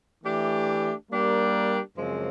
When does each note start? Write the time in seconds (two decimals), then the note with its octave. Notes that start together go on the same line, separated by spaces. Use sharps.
0.23 E3 A3 D4 G4
1.10 G3 A#3 D4 G4 A#4
1.97 F#2 C#3 F3 G#3 C4